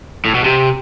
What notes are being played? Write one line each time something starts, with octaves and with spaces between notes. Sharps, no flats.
A2
B2
C3